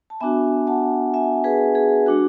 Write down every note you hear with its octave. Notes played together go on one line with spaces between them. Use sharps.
A5
B3 D4 F#4 E5 G#5
F#5 A5
E5 G#5
G#4 B4
G#4
G#3 D4 F#4